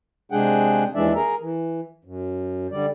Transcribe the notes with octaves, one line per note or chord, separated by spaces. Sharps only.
C3 G#3 D4 G#4 F#5 G5
D#2 E3 G#3 D4 D5 E5
G#4 A#4 A#5
E3
F#2
D3 G3 D5